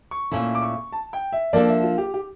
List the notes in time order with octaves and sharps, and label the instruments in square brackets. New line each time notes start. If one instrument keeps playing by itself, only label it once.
[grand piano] C#6
[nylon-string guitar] A#2 A3 C#4 E4 [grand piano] C#6
[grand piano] D6
C#6
A5
G5
E5
[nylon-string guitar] F3 A#3 D4 A4 [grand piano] D5
[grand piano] E5
F4
G4
G4